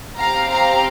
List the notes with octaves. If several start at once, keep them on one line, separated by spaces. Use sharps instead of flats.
C4 G4 F5 A#5
F5 A#5